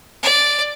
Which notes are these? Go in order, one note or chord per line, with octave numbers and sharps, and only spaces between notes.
D5